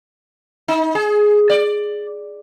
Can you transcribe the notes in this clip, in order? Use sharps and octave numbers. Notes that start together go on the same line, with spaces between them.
D#4
G#4
D5